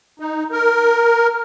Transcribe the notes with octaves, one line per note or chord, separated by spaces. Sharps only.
D#4
A#4